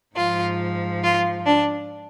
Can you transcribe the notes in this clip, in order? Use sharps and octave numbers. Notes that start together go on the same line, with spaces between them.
G#2 F3 F4
F4
D4